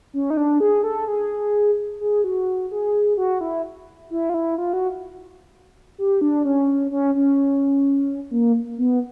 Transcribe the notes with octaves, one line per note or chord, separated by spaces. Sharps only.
C#4
D#4
D4
G#4
A4
G#4
G#4
F#4
G#4
F#4
E4
E4
F4
E4
F4
F#4
G4
D4
C#4
C#4
C#4
A#3
B3